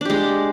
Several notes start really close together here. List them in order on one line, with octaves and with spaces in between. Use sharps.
D4 G4 G#3